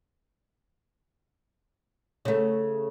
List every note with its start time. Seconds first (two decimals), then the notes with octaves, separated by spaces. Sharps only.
2.25 C#3 A3